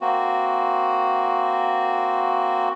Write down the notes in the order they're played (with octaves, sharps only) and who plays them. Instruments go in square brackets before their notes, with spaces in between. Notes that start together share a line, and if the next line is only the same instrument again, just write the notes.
[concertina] A#3 C4 F#4